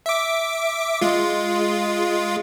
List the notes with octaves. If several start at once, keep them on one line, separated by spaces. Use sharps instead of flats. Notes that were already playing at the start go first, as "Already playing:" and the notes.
E5 D6
G#3 F4